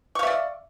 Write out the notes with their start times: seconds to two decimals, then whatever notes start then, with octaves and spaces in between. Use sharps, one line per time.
0.15 C#6
0.19 F5
0.23 E5
0.27 D5